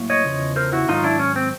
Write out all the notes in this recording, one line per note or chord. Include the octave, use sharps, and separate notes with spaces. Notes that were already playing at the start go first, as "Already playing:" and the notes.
Already playing: A2 F#3 A#3
C#5 D#5
E2 C#3 F3
A#4 C5
E4 F#4
G#2 D#3 F#3 D#4 F4
D4 E4
C#4
C4